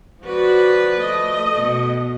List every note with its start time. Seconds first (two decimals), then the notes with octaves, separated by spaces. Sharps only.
0.23 F3 F#4 B4 D5
0.96 A3 D#5
1.55 B2